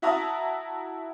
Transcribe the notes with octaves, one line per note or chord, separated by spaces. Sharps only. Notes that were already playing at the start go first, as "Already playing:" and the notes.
E4 F#4 E5 A5 A#5 D#6